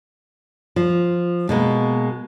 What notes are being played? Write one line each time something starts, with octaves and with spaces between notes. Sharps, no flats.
F3
B2 G#3 A#3